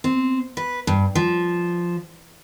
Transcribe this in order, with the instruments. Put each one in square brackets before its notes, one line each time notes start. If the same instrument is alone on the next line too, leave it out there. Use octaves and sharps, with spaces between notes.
[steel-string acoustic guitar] C4
B4
G2
F3